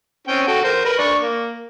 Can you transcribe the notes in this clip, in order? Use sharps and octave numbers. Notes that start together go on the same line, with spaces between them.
C4 C#4 G5
F#4 A4 G5
A#4 C5
A#4 B4
D4 C#6
A#3